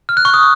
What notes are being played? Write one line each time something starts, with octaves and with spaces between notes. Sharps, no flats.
F6
F#6
C#6
D#6